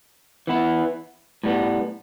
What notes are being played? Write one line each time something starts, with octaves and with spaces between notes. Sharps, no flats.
E3 B3 E4
A2 G3 B3